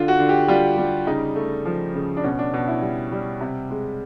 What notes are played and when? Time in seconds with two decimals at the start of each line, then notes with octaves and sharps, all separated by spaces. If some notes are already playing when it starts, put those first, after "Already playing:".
Already playing: D3 F4
0.08 F#4
0.19 D3
0.29 G4
0.48 G3 F4
0.78 G3
1.07 C#3 D#4
1.35 A3
1.65 F3
1.95 C#3
2.17 D4
2.24 B2 C#4
2.39 D4
2.53 B2 D4
2.67 E4
2.82 G3
3.12 G3
3.41 C3
3.70 G#3